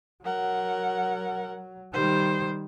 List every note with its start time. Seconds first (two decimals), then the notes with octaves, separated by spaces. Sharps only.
0.24 F#3 A#4 F#5
1.94 D#3 G3 C5